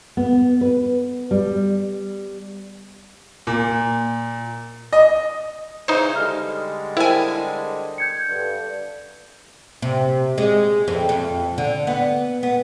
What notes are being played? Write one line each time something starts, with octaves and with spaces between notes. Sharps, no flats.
B3
B4
G3
A#2
D#5
C#3 E3 D#4 C5
D3 G3 G#3 F6
E4 A#4 C5 G5 G#5
G6 G#6 C#7
G2 D3
C3
G#3
F2
F2
D3
B3
B3